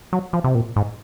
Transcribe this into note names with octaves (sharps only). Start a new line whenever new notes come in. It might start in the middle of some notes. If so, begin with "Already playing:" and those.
F#3
F3
C3
A#2
G#2